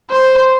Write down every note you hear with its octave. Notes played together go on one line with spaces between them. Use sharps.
C5